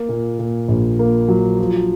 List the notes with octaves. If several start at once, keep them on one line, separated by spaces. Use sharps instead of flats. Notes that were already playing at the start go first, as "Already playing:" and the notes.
Already playing: A#3
A#2
A#2
A#1
A#3
F#3
F3